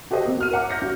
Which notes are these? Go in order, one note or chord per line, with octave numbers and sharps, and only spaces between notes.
F#4 G4 A4 C5 D#5
A#3 C4
F#4 F6 D#7
A#4 C#5 E5 F#5 A#5 D6
F6 G6 A#6 C#7
G2 F#4